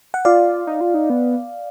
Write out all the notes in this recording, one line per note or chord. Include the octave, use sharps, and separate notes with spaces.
F#5
F4 D5 F5
D#4
F4
D#4
B3